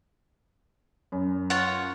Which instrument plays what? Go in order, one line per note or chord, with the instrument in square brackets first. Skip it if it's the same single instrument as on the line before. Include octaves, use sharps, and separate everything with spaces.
[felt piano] F#2
[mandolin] F4 C#5 F#5